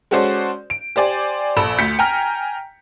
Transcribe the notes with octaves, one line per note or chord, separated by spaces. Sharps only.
G#3 C#4 F#4 A4 C5 D5
D7
G4 C5 D5 G#5
A#1 A4 B5 E6 E7
D2 G6 B6 C#7
G5 G#5 A#5 F6